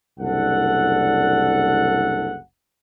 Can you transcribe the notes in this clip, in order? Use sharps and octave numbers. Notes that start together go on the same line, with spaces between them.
F#1 C2 D4 A4 F#5